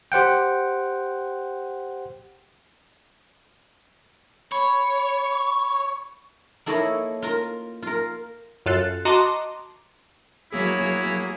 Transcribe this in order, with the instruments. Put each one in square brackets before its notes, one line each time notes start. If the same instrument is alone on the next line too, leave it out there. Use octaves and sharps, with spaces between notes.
[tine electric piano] G4 C5 F#5 G5
[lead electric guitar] C#5 [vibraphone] B5
[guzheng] A#3 E4 A4 C#5 D#5
F4 A#4
F4 A#4
[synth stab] F#2 F4 A4 F#6 A6
F#4 D#5 A5 A#5 C6 D6
[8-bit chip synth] F#3 A#3 G#4 [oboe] E4 [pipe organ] F#4 C#5